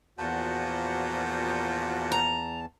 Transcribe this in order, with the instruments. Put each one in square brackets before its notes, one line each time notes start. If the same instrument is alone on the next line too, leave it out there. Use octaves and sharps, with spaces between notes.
[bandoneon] E2 A5 [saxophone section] A#2 F3 [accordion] F#4 F#5 G6
[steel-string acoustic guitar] A#5